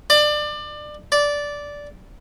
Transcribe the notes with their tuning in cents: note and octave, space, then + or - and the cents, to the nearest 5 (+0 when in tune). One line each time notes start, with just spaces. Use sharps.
D5 +25
D5 -10